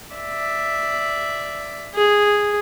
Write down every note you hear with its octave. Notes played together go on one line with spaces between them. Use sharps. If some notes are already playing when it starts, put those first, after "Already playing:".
D5 E5
G#4